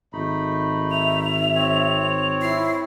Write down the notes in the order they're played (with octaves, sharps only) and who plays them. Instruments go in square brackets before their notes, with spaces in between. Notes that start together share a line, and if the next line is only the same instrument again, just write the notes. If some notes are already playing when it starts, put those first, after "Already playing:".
[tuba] G#1 [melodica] A3 D#4 B5
[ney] E5 [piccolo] F7
[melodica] C4 C#5
[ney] E4 [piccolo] C7